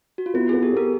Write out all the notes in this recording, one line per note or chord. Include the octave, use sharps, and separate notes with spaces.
F#4
F4
B3 E4
B3 G#4
G4 A4
B3 G#4 A#4